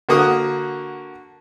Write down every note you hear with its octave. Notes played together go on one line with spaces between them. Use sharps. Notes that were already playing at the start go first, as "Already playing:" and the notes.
D3 A#3 F#4 D#6